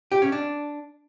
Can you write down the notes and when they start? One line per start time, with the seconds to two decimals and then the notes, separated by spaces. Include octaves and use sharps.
0.12 G4
0.22 C#4
0.32 D4